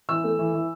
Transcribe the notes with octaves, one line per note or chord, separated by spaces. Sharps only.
E3 E6
A3
E3
E3